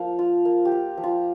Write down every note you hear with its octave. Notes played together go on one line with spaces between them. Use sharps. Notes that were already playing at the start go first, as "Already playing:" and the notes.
Already playing: F3 A#3 F5
F4
A#3
G4
F4
F3
F4